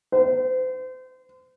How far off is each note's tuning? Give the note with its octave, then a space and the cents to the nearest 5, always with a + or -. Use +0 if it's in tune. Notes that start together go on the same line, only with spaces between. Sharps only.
C5 -35